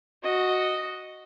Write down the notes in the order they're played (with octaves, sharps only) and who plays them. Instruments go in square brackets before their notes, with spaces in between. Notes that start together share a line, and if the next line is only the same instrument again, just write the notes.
[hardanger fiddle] F#4 D#5